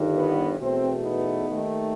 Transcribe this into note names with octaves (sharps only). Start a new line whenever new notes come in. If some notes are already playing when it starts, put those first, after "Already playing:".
Already playing: G1 G2 D#3
B3
E2 B2 A3 C4
B3 D#4
D#2 D#3 A3